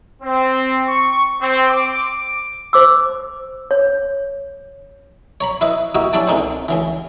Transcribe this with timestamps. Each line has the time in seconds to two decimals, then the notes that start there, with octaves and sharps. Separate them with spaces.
0.22 C4
0.88 C#6
1.40 C4
1.70 D6
2.73 C5 D6 E6
3.71 C#5
5.41 C#5 A#5 B5
5.61 E4 B4 D#5
5.95 A#3 E4 F#4 G4 D#5
6.13 C#4 D4 E4 G4 G5 A5
6.28 C2 G#2 D4 D#4 C5
6.68 C#2 C#3 E3